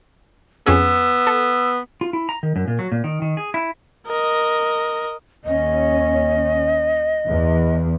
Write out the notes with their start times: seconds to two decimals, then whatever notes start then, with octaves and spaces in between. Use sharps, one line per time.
0.66 F2 B3 C#4 G#4 E6
1.27 A4
2.01 F4
2.13 E4
2.29 A#5
2.43 D#3
2.56 F#2
2.68 A#2
2.79 F#3
2.92 A#2
3.04 D#3
3.22 D#3
3.37 G#4
3.54 E4
4.07 A#4 D#5
5.45 D#2 C#4 D#5
7.29 E2